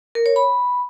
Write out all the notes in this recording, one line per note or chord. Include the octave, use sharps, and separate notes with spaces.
A#4
C#5
B5